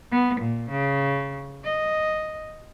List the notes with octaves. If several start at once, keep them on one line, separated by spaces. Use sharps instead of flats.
B3
A#2
C#3
D#5